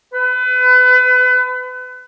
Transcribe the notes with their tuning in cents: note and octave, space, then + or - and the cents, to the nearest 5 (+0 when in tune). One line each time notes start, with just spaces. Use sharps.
B4 +30